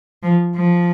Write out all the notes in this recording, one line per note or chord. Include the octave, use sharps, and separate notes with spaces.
F3
F3